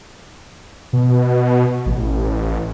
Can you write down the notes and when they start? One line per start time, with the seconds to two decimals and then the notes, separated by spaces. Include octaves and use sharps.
0.93 B2
1.86 A1